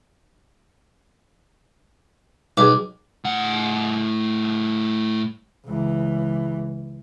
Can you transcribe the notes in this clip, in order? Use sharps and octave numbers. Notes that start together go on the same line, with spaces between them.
B1 G#4 B4 D6
A2 F#5
C#2 E3